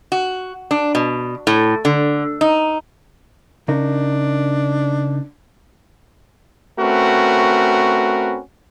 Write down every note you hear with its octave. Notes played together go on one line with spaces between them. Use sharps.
F#4
D4
B2
A2
D3
D#4
C#3 D4 D#4 A#4
A3 C4 C#4 F#4 A#4 B4